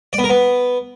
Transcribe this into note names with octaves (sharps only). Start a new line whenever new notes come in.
D5
B3
A#4
B3